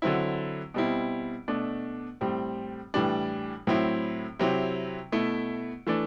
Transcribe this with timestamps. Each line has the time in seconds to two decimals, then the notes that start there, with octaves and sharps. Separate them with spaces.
0.02 D3 F#3 C4 E4
0.74 B2 G3 C4 E4
1.48 B2 A3 D4
2.21 A2 G3 C4
2.94 A2 E3 G3 D4
3.67 A2 F#3 C4 E4
4.39 C3 F#3 C4 E4
5.12 B2 A3 E4
5.87 E3 A3 D4